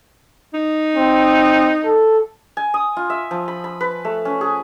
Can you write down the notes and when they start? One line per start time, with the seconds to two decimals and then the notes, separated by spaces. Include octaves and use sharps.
0.54 D#4
0.95 C4
1.85 A4
2.57 G#5
2.74 D#6
2.97 F4
3.10 E5
3.31 F3
3.48 B5
3.64 B5
3.81 B4
4.05 A3
4.25 C#4
4.41 G#4